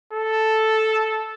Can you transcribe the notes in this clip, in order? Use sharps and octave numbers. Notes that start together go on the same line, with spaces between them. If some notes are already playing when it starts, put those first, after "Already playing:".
A4